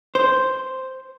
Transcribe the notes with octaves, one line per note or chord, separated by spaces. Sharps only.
C5